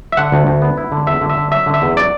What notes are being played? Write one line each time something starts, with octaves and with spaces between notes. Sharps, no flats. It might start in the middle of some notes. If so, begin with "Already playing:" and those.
E5
D3 F#5
D2
D2
B3
E4
D3
E2 E5
D3
E5
D3
F#3 E5
D3
E5
E2
F#3 D5